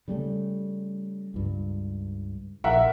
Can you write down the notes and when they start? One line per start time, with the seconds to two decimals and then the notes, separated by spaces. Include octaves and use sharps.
0.08 C#3 G3 A3
1.34 C#2 G2
2.64 A#1 A#4 E5 F#5